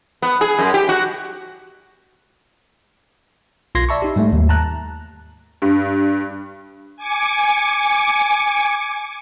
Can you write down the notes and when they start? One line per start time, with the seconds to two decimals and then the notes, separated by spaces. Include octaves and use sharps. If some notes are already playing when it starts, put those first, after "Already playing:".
0.22 B3
0.41 G#4
0.59 F#2
0.74 G4
0.89 F#4
3.75 B1 F4 C6 G#6 A#6
3.89 D5 E5 A5 B5 C#6
4.02 D#4 G4
4.16 G#2 G3 A3 E5
4.33 D#2
4.49 A5 A#5 F#6
5.62 G2
6.97 G#5 D6 C#7